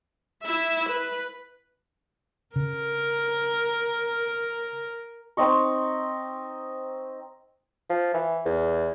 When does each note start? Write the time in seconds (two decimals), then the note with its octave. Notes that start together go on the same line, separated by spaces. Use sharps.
0.43 E4 E5
0.89 B4
2.56 C#3 A#4
5.37 C4 D#4 D#5 C#6
7.89 F3
8.14 E3
8.45 E2